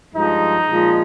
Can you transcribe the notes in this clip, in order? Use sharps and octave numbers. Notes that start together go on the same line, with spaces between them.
G2 F3 G#3 D#4
A#2 F3 G#3